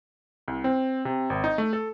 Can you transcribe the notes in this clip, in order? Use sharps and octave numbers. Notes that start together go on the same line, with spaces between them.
C2
C4
C3
G#1
D#4
A3
A4